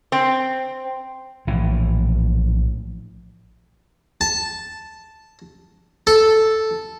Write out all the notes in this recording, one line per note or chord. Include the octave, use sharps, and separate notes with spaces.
C4
A#1 A2 E3
A5
A4